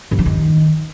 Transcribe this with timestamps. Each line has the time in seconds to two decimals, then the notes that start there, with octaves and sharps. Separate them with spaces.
0.11 G2
0.19 F3
0.26 D#3